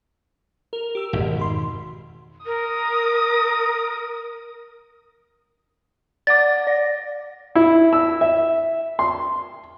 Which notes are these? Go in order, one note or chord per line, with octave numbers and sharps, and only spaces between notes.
A#4
G4 E6
G#1 F2 B2
B5 C6
A#4 D#6
D5 F#5 D6 A6
D5 A#6
E4
E6
E5
C6